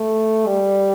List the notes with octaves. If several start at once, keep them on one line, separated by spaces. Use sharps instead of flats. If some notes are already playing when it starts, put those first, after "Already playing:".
Already playing: A3
G3